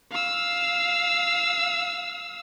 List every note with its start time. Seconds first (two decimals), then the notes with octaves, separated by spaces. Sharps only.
0.11 F5 E6